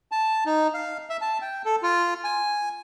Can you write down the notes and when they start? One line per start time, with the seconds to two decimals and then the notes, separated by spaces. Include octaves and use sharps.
0.12 A5
0.46 D#4
0.74 F5
1.10 E5
1.21 A5
1.41 G5
1.65 A4
1.83 F4
2.24 G#5